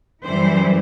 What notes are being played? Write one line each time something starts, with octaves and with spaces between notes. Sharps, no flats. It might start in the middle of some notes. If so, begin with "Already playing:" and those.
F#2 E3 G3 C5